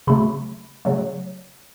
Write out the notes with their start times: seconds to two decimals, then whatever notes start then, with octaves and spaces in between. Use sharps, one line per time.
0.07 C#3 F#3 A3 B5
0.85 C#3 F#3 A3